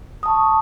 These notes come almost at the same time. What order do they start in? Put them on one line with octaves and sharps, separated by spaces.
D#6 A5 C#6